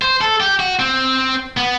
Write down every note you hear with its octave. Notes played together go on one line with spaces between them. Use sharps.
C5
A4
G4
F#4
C4
B3